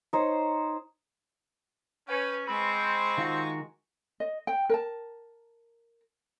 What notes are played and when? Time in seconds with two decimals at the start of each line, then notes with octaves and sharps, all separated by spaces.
0.13 D#4 C5 C#5
2.08 C#4 B4 G5
2.47 G#3 C4 B5 C#6
3.18 D#3 F4 F#4
4.20 D#5
4.47 G5
4.70 A#4 A5